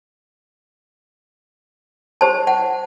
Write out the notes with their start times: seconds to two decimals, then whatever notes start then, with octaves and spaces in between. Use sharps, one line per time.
2.21 G4 C5 A5
2.47 F#5